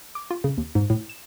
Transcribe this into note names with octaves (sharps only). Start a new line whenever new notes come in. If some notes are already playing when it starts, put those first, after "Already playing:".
D6
F4
C#3
D#2
G#2
A2
E7